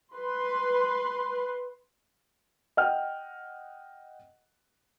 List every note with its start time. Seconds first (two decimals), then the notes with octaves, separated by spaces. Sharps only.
0.15 B4 C6
2.77 D#5 F#5 G5 F6